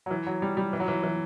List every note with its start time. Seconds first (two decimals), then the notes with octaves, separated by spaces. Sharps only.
0.06 F#3
0.11 E3
0.26 F#3
0.42 G3
0.57 G3
0.73 E3
0.80 F#3
0.88 E3
1.03 E3